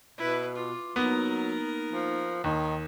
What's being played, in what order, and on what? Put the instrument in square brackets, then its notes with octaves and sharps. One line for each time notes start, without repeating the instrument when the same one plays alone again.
[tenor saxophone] B2 [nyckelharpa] E4 B4
[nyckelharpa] F4 [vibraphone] D6
[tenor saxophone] F#3 [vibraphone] A#3 D#4 [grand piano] B3 [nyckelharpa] A#4
[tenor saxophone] F3
[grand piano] D#2 [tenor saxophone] D#3